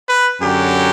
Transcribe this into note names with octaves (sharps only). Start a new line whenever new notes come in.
B4
F#2 D3 F#3 G4